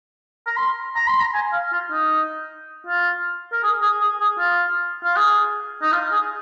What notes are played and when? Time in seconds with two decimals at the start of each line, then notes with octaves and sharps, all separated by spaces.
0.47 A#5
0.57 C6
0.96 A#5
1.08 C6
1.20 A#5
1.34 G#5
1.53 F5
1.72 F4
1.91 D#4
2.86 F4
3.53 A#4
3.63 G#4
3.82 G#4
4.01 G#4
4.20 G#4
4.39 F4
5.04 F4
5.16 G#4
5.82 D#4
5.92 F4
6.12 G#4